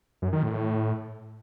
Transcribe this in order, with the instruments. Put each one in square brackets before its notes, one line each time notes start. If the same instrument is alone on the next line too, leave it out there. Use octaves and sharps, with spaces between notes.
[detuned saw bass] F#2
D#3
A2
A2